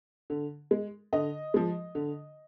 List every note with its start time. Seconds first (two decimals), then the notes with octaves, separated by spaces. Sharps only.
0.30 D3
0.71 G#3
1.13 D3 D#5
1.54 F3 G#3
1.95 D3